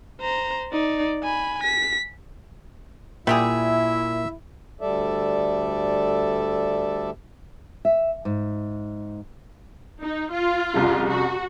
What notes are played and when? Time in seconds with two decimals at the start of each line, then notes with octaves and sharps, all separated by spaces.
0.21 C5 A#5
0.72 D#4 D5
1.23 G#5 B5
1.63 B6
3.27 A#2 G3 E4 G4 G#4 E5 F#5
4.81 D2 G3 A4 D5 E5
7.85 E5
8.25 G#2
10.02 D#4
10.32 F4
10.73 C2 F2 C#3
11.08 F#4